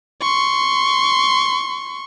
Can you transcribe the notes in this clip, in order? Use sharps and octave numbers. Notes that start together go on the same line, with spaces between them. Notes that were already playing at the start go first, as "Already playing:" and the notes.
C6 C#6